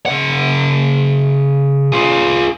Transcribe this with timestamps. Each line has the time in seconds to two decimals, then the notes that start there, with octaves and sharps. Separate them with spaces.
0.06 C#3 F#5
1.92 F4 G#4